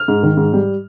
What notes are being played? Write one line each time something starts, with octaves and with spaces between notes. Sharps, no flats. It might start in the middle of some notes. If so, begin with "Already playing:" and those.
Already playing: F6
G#2
D#3
G#2
G3